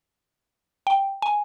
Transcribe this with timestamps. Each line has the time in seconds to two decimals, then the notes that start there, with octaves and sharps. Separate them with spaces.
0.87 G5
1.22 G#5